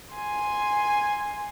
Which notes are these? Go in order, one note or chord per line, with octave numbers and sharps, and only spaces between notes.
G#5 C6